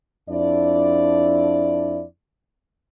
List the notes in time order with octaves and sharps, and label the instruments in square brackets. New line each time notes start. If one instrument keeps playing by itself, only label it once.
[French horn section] F2 D4 E4 D5